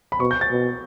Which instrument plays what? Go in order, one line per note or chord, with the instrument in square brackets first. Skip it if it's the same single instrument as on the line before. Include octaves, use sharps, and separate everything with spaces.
[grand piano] B5
[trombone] B2 [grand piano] C#6
[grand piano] G6
A6
[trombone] B2